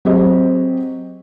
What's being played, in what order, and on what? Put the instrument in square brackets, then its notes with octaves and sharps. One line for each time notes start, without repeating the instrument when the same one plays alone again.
[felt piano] F#3 C4 G4 G#4 D#5